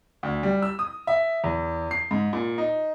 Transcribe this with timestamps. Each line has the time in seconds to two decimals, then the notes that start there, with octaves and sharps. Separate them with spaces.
0.23 D2
0.43 G3
0.62 E6
0.79 D#6
1.07 E5
1.44 E2
1.91 C7
2.11 G#2
2.33 A#2
2.58 D#4